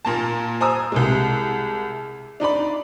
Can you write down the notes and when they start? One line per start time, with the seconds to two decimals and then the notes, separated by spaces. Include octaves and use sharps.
0.05 A#2 A#3 A5
0.60 C5 G#5 A#5 D#6 E6
0.92 C2 C3 G#3
2.40 D4 D#4 D5 B5